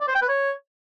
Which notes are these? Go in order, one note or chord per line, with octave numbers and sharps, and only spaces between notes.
D5
C5
G5
B4
C#5